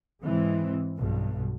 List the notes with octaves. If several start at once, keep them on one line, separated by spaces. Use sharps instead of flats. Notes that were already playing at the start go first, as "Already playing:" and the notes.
G#2 E3 G#3 C4
B1 G2 B2